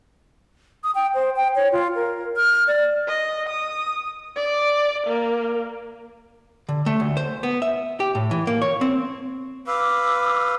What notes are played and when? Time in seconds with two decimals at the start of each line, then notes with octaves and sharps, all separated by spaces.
0.84 D#6
0.95 G5
1.14 C5
1.36 G5
1.55 C#5
1.72 F4
1.95 A#4
2.37 F6
2.68 D5
3.08 D#5
3.49 D#6
4.37 D5
5.07 A#3
6.69 D3
6.86 A3
7.00 D2
7.17 C5
7.43 B3
7.62 E5
8.00 G4
8.15 A2
8.31 E3
8.47 A#3
8.62 C#5
8.81 C4
9.67 B4 F5 D6 E6